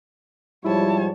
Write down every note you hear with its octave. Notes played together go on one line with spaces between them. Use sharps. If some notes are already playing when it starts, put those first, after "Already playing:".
G#2 F3 G3 E4 C#5 A5